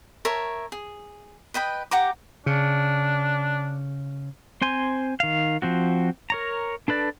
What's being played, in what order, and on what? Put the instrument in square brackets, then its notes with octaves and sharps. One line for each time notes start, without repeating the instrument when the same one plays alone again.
[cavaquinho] A#4 C#5 E5 A5
G#4
B4 D#5 G5 B5
G4 F#5 A#5 D6
[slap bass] C#3 [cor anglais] D4
[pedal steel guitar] C4 C5 G#5 C6
D#3 F5
F3 C4 F#4
A#4 C#5 A#5
D4 A4 B4 D5